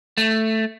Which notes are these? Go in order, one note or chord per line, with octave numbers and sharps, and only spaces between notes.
A3